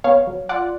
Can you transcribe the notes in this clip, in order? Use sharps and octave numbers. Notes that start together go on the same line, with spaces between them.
B3 C#5 F5
F#3
F4 D5 F#5